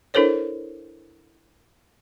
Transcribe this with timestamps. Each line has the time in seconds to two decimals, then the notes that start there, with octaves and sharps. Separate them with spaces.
0.14 D4 E4 A4 A#4 C5 C#5